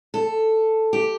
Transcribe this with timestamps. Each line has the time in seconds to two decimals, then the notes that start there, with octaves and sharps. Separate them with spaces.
0.14 A4
0.93 G4